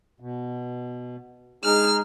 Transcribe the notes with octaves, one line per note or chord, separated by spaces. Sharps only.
B2
G#3 D#4 G#4 F6